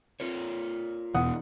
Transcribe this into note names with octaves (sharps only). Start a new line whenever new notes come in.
F4 A#4 C#5
E2 B2 E3 F#5 D#6